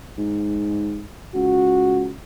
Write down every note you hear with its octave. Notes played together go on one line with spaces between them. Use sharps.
G#2
C#2 F#4